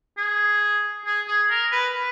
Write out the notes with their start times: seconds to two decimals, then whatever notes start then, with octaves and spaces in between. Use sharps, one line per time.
0.18 G#4
1.05 G#4
1.28 G#4
1.50 A#4
1.72 B4
1.94 B4